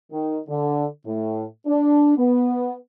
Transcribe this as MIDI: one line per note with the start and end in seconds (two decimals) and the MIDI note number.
0.12 0.39 51
0.48 0.86 50
1.06 1.45 45
1.66 2.15 62
2.17 2.75 59